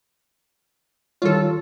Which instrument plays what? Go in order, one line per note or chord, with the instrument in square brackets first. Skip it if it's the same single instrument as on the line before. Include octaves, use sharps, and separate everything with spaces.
[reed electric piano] D#3 G3 C#5 [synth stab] F4 A4